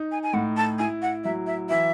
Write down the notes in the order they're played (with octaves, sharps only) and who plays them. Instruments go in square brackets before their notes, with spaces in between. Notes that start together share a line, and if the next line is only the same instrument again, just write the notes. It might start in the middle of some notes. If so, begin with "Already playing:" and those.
Already playing: [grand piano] D#4
[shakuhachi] G#5
G#5
[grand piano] A2 [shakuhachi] F#5
[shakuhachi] A5
[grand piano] E4 [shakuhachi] G#5
[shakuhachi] F#5
[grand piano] F#3 [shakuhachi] E5
[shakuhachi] E5
[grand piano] E3 [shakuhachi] E5